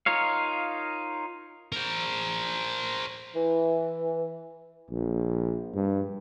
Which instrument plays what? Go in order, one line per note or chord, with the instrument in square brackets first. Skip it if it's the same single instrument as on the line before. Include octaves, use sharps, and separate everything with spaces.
[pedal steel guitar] D#4 F4 A#4 C#5 F5
[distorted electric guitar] A#4 C5
[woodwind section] E3
[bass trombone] A#1
G2